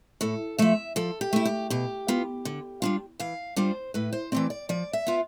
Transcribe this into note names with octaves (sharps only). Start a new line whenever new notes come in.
A2 A4
F3 A3 E5
F3 A4
G4
A3 E4
G4
B2 G4
B3 F4
D3
G3 D4 F4
E3 F5
G3 D4 F4 C5
A2 B4
C5
E3 A3 C4 D5
D5
F3 D5
E5
B3 F4